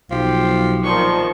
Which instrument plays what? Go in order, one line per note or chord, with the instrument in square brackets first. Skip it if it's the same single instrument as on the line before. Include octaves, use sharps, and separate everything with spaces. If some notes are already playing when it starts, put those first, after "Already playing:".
[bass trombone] B1 [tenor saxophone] F3 [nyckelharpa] G4
[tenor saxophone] A#2 [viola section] D#3 F3 [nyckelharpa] C6 C#6